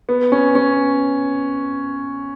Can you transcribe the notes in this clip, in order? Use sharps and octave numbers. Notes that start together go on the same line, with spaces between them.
B3
C#4
C#4